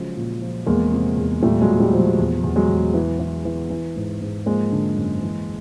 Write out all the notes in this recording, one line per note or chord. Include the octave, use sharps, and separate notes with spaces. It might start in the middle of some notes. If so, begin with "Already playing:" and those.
Already playing: C#3 F3 F#3 G#3
A#2
F3
E2 G#3 A#3
C3
E2
A#2 G3 A3
F#3 G#3
A#2
G3
F3
F#3
E2
E2
F#3 G#3
E2
E3
E3
E3
E3
G#2
G#2
F3 G#3 A#3
D3
F#2
E3